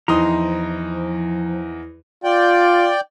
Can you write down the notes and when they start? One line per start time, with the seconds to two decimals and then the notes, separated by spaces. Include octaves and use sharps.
0.08 E2 F3 D#4 E4 A#5 C6 D#6
2.24 F4 D5 G5